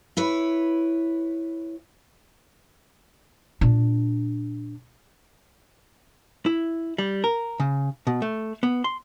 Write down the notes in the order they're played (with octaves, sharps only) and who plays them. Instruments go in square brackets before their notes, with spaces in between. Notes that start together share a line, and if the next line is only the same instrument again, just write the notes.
[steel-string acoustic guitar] E4 B4 C#5
[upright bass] A#2 D4
[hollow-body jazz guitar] E4
G3
A#4
C#3
B2
A3
B3
C6